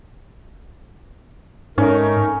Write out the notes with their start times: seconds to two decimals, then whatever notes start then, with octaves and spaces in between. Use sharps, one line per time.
1.78 G#2 A3 C#4 D#4 A#4